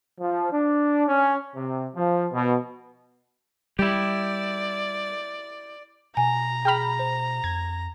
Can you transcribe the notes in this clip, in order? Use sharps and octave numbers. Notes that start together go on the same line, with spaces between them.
F3
D4
C#4
C3
F3
B2
G3 E4 G4 D5
B2 G#5 A#5
G#4 G5 B5 F6 F7
C5
F2 G#6